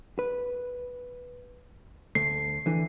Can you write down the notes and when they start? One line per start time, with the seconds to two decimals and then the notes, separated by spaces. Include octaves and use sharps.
0.19 B4
2.15 D2 A3 C7
2.66 D3 E3